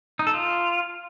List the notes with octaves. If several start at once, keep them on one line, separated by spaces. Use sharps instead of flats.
D#4
A4
F4